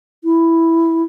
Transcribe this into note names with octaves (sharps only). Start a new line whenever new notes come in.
E4